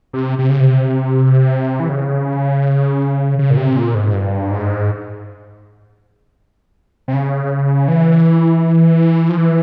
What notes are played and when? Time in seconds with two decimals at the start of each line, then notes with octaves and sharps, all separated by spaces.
0.13 C3
0.39 C3
0.49 C#3
0.60 C3
1.80 E3
1.89 C#3
3.39 C#3
3.50 A#2
3.57 C3
3.76 A#2
3.95 G#2
4.14 G2
4.51 G#2
7.08 C3
7.14 C#3
7.88 E3
9.29 F3
9.38 E3